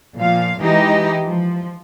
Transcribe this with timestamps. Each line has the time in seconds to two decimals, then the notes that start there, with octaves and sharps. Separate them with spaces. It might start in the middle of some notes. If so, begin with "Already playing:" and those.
0.18 A#2 F3 F5
0.61 E3 G#3 D#4 E4 G4 D#5
1.27 F3